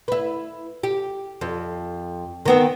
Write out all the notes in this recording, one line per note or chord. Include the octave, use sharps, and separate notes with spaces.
E4 B4
G4
F2
D#3 B3 C4